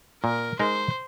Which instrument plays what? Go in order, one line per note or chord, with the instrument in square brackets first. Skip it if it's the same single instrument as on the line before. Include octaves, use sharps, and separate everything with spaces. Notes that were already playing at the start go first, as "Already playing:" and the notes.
[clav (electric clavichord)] A#2 [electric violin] A#4
[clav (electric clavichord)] G#3 D#4 A#4 [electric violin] C5